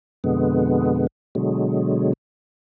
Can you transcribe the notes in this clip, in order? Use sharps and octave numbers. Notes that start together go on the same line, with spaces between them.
F2 B2 D3 G#3 B3
B2 D3 F#3 G#3